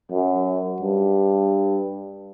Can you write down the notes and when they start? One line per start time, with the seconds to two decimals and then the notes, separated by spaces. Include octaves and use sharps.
0.11 F#2
0.82 G2